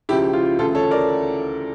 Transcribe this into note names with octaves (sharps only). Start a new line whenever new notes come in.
C#2 C#3 F3 E4 G4
F4
D2 C#3 E3 F4 A4
A4 C#5
A#4 D5